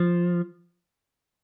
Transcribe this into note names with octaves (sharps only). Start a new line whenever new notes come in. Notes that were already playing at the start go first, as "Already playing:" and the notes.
Already playing: F3